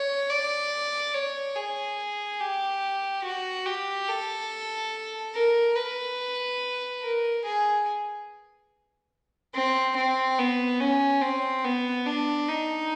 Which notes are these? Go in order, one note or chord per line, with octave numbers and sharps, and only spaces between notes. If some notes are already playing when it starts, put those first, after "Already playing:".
Already playing: C#5
D5
C#5
G#4
G4
F#4
G4
A4
A#4
B4
A#4
G#4
C4
C4
B3
C#4
C4
B3
D4
D#4